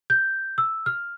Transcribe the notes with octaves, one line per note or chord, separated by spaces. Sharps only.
G6
E6
F6